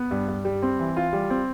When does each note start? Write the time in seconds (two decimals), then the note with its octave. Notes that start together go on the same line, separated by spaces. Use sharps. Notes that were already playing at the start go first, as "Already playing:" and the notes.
Already playing: B3
0.11 G2
0.28 G2
0.45 G3
0.63 C4
0.80 E3
0.97 F4
1.13 G3
1.30 C4